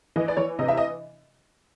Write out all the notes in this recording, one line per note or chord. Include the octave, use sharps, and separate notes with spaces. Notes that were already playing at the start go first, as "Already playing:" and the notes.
E3 D#5
D5
E3 C#5
C3 D#5
E5
D#5